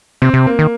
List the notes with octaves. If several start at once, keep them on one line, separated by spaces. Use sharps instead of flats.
C3 C4
C3
A#3
D#3